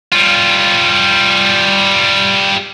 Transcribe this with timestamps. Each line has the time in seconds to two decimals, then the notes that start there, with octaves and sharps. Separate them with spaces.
0.13 G3 F4